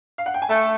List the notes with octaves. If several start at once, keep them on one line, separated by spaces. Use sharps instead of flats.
F5
F#5
G5
G#5
A3 A5